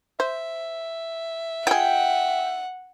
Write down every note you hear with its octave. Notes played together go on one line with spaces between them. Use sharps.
C5 E5
F4 G#4 F#5 G5